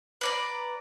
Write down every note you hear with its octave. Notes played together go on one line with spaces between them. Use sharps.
B4 D5 A#5